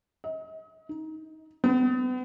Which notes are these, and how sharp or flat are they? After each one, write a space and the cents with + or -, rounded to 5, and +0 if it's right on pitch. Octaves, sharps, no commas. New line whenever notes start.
D#5 +40
D#4 +15
B3 +45